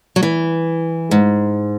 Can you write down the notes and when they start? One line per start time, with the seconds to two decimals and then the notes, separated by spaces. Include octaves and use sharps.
0.16 F#3
0.23 E3
1.11 G#2